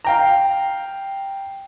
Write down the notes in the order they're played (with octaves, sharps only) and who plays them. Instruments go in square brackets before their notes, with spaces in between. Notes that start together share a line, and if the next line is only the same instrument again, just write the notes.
[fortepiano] F5 G5 A#5